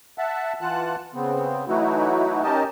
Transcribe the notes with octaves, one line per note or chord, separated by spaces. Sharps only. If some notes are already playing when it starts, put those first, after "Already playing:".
E5 F#5 A5
E3 F4 F#5 A5 F#6
C#3 B3 C4
E3 F#3 A3 D#4 E4 F#4
C#4 D#4 G4 A#4 D#5 A5